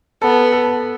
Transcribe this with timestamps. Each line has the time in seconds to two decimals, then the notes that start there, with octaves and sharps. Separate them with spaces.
0.22 B3 A4
0.52 A4